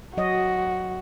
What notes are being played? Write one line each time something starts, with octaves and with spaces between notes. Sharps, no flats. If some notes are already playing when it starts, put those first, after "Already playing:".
F#3 F#4 C#5 D#5